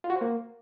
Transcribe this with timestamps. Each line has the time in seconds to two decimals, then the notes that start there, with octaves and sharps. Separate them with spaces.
0.04 F4
0.10 F#4
0.16 C5
0.21 A#3